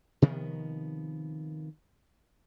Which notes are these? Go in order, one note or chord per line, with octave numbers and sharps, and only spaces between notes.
C3 D#3 F3 B3